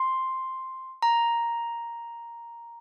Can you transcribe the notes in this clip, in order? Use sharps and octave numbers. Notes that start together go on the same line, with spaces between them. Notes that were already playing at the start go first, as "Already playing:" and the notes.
Already playing: C6
A#5